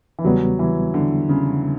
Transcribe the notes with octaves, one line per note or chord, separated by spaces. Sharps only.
E3
E2 C#3 F#3 G3 B3
E3
D3
C#3